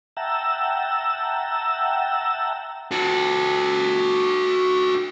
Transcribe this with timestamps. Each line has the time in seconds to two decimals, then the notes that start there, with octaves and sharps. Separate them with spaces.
0.17 E5 F#5 G5 A5 A#5 E6
2.91 F#4 A4